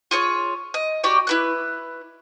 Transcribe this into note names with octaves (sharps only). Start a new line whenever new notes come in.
F4 G#4 C#5
D#5
F#4 G4 D5 G5
E4 B4 F#6